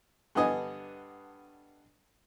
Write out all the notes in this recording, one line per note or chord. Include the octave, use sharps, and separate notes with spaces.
G2 D3 B3 D#5 G#5